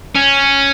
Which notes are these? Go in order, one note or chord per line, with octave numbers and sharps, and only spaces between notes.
C#4